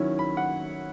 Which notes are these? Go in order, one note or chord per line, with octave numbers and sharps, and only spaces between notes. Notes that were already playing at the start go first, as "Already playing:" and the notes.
Already playing: D#3 F#3 C#4 E4
B5
F#5